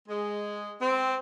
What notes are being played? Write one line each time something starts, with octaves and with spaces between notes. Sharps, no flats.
G#3
C4